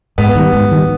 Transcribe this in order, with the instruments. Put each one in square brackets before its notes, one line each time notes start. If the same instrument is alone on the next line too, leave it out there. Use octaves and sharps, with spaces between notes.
[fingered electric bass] G#2 [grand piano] B3
[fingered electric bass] D#3 G3
G#2
D#3 G3